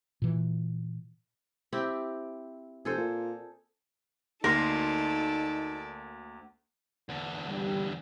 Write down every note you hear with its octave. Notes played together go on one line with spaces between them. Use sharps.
A#2 E3
C4 E4 G4
F1 G#4 A4 C5
A#2
D2 A#3 D#4 A4 A#4 D5 C6
E2 D3
G3